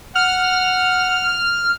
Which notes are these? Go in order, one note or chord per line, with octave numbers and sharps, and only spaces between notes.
F#5 F6